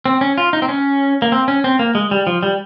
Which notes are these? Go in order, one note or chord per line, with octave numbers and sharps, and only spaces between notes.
C4
C#4
F4
D#4
C4
C#4
A#3
C4
C#4
C4
A#3
G#3
G3
F3
G3